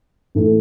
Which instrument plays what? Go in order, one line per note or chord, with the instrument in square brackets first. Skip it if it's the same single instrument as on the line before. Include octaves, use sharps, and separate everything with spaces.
[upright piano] A2 E3 A3